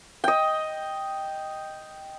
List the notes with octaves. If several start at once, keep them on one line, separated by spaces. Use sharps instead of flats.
D#5 G5